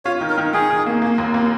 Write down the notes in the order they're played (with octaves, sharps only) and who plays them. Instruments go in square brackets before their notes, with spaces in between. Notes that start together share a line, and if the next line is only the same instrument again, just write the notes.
[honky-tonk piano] F4 [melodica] C#5
[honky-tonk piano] D#3
[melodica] A#4
[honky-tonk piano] D#3
[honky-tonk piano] D#3 [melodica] G#4
[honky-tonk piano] D#3
A#3
A#3
D#2
A#3